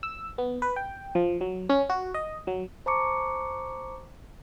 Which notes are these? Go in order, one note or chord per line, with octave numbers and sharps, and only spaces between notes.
E6
B3
B4
G5
F3
F#3
C#4
F#4
D#5
F#3
C5 A5 A#5 C#6 D6 C#7